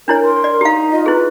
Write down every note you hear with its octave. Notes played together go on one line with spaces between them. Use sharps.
D4 E4 A#4 C#5
A#4 C6
D5
D#4 G4 F5 A#5
F4 D#5
E4 G#4 B4